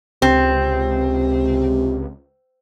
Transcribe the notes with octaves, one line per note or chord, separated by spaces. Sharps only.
C#2 C3 C4